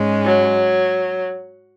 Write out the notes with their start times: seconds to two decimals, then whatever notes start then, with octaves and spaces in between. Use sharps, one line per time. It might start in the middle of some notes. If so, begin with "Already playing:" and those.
Already playing: G#2 G#3 C#4
0.25 F#3